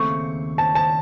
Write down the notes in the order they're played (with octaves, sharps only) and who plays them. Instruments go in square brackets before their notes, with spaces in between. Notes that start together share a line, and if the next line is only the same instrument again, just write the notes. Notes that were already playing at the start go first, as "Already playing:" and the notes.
Already playing: [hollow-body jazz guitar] D#2 C#3 A3 C4 [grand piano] C#6
[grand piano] A5
A5